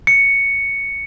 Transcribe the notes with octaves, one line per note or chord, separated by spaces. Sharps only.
C#7